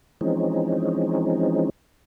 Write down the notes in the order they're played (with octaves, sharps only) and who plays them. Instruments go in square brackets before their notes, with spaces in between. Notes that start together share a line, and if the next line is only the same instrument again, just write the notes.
[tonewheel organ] E3 F3 G#3 C4 C#4 D#4